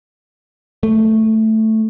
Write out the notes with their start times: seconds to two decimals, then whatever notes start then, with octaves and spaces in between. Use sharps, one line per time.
0.83 A3